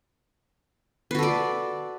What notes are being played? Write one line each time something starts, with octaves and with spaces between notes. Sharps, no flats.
F#4 A4 B4 D5